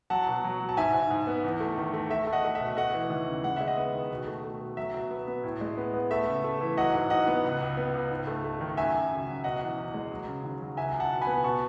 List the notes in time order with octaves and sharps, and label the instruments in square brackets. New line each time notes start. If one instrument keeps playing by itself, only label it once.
[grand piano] F#3 F#5 A5
B2
F#3
F#3
A5
G#2 E5 G#5
G#2
G#2
B3
E2
A3
D#3
A3
A3 E5
A3
D#5 F#5
A3
E5
B2
A3 D#5 F#5
E3
D#2
C#3
G#3 F#5
G#3 E5
D#5 F#5
B3
D#3
B2
A3
A3
B2
F#3 E5
B2
B3
B3
A2
G#3
B3
B3
A3 E5
C#3
A3
E3
F#3 D#5 F#5
G#2
G#2 D#5 F#5
B3
C#2
C#2
B3
C#2
G#2
A3
A3
D#3
F#2 E5 G#5
F#2
C#3
F#3
B2 D#5 F#5
E2
E2
G#3
F#3
C#3
D#2
F#3
C#2 E5 G#5
C#2
F#5 A5
B2
G#5 B5
B3
B2 A5 C#6